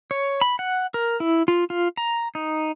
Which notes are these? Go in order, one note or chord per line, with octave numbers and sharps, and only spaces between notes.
C#5
B5
F#5
A#4
E4
F4
F4
A#5
D#4